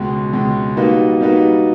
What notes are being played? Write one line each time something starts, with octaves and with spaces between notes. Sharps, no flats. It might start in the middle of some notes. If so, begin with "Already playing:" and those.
Already playing: C#2 B2 G#3
C#2 B2 G#3
G3 A#3 D#4 F#4 B4
G3 A#3 D#4 F#4 B4